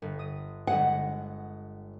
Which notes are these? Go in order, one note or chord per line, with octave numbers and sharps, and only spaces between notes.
G1
D#6 D#7
G1 G#3 F#5 D#6